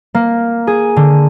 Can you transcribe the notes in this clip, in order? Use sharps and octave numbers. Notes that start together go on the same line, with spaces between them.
A#3
G#4
D3